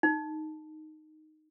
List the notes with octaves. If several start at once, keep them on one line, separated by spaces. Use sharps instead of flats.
D#4